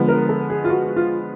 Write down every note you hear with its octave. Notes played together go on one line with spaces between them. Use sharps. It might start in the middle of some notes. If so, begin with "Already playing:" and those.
Already playing: D3 F3 G#3 B3
A#4
A4
G#4
F4
F#4
F4